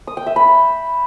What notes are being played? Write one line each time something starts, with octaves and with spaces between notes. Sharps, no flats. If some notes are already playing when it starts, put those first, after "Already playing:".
D#6
G5
E5
B5